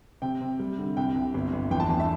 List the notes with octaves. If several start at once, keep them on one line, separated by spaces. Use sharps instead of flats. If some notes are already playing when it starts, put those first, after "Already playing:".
C3 G5
C3
G3
D3
C2 G5
C2
G1
G1
E2 G5
A5
E2 A5
E5